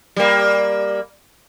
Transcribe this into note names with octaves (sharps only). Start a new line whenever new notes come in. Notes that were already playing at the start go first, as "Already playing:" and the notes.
G3 A#3